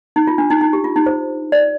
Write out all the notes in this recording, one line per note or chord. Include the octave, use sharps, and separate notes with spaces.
D#4
F4
D4
D#4
D#4
G4
F4
D#4
C5
D5